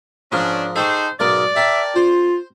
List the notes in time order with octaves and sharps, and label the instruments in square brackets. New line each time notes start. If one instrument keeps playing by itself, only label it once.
[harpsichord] G#2 F3 A#4 [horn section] C#4 D4
[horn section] D#4 G#4 C5 [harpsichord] A4 G5 C#6
[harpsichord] B1 G#2 A#4 [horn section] D5
[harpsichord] G4 A#4 A5 [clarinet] E5
[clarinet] F4 [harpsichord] C5